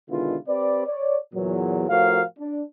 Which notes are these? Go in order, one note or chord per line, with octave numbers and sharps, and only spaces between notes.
B2 D3 D#3 G#3 E4 F4
C4 G4 B4 D5
C#5 D5
E2 A#2 F#3
A2 F3 F#4 A#4 F5
D4